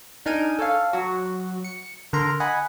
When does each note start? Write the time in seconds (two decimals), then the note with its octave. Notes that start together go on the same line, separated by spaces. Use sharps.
0.26 D4 D#4 A#4 G#5 D#7
0.59 A4 C#5 F5
0.93 F#3 F#4
1.64 C#7
2.13 D3 A#4 A#5 C6
2.40 D#5 F#5 G#5 B5